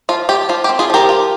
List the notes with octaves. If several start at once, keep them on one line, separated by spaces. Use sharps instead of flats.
F3 F4
F4 G4
F3 F4
G4
C4
F4 G#4
F3 G4 A#4
F4